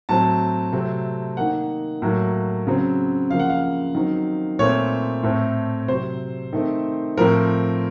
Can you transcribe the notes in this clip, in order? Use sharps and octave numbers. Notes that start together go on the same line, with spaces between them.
A2 F#3 C4 A5
C3 F#3 A3 C4
D#3 A#3 F#5
A2 F#3 A#3
C#3 F#3 C4
C#3 F3 A#3 F5
F#5
F5
D#3 F#3 C4
A#2 A3 C4 C#5
A2 A3 C4
C3 F#3 C4 C5
D#3 A3 C4
A2 F3 C4 A#4